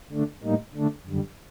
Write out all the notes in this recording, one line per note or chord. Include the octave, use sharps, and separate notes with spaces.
D3 A3 D4
A2 G3 A#3 D#4
D3 A3 D4
F#2 D3 G3